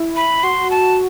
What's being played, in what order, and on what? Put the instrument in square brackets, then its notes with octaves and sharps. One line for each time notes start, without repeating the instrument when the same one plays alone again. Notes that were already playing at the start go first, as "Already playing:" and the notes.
Already playing: [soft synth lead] E4
[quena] B5
[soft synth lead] F#4 [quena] C6
[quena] A5